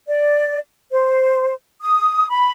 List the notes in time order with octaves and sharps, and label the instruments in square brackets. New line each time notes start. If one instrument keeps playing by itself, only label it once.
[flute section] D5
C5
D#6
B5